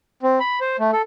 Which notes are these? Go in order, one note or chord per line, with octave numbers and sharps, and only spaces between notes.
C4
B5
C5
A3
A4